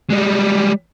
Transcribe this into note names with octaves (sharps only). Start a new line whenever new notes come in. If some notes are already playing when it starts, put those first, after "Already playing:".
G3 G#3